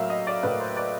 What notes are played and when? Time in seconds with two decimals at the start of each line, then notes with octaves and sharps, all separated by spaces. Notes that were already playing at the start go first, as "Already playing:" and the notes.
Already playing: A2 F#3 A#3 E5 F5
0.10 D#5
0.27 D5
0.43 A2 F#3 A#3 B4
0.60 C5
0.76 D5